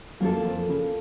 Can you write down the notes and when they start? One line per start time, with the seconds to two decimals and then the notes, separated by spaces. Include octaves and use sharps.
0.20 F#2 F#3 A#3 F4 A4
0.45 F2 F3
0.69 C#3